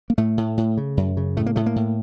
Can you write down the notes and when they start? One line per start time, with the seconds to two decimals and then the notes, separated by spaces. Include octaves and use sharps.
0.10 A#3
0.18 A2 A3
0.38 A2
0.57 A2
0.77 C#3
0.97 F#2
1.17 C#3
1.37 A2 A3
1.46 A#3
1.56 A2 A3
1.66 A#3
1.76 A2